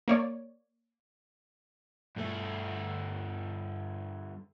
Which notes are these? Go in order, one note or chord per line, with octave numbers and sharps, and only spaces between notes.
A#3 C#5 D5
G2 A3